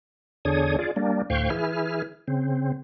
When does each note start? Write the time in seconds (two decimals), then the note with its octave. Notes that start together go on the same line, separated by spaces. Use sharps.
0.45 E2 D3 D4 G#4 C#5 D#6
0.79 F4 G#4 D5
0.96 G3 A#3 D4
1.30 D2 A2 C5 F5 G5 C#6
1.50 E3 E4 G#4 F6
2.28 C#3 C4